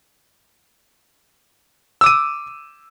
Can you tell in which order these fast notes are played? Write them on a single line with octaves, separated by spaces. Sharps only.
E6 D6 D#7